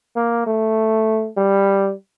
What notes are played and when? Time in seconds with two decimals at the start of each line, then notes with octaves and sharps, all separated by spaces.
0.16 A#3
0.47 A3
1.37 G3